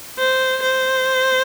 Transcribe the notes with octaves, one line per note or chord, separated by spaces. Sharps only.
C5
C5